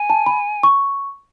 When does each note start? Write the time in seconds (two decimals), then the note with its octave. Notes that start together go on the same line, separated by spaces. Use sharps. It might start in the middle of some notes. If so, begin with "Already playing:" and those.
Already playing: G#5
0.10 A5
0.26 B5
0.63 C#6